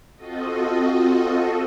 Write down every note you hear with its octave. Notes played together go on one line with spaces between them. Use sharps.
C4 F4 F#4 A4 D#5